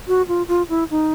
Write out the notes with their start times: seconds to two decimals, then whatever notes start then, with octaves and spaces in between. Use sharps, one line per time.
0.08 F#4
0.28 F4
0.48 F4
0.69 E4
0.91 D#4